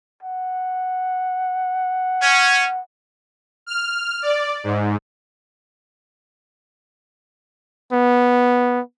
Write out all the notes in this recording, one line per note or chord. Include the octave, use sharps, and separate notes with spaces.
F#5
C#4
F6
D5
G#2
B3